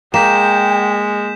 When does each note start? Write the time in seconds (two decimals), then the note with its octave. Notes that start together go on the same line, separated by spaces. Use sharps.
0.14 G#3 A#3 G5 G6 B6 E7